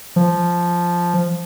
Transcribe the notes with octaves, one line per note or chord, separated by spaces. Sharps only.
F3